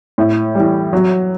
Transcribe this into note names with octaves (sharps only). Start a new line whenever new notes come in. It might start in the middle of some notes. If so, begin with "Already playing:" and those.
A2
E3 G3
F#3